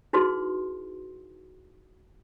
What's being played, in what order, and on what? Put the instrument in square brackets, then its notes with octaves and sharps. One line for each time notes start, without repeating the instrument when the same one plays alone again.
[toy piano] D#4 E4 F#4 G#4 B4 C6